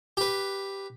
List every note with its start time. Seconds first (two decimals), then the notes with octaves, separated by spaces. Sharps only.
0.17 G4 B4